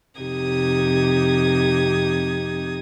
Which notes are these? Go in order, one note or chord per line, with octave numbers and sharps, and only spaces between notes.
F2 C3 D#4 G4 D#6 G#6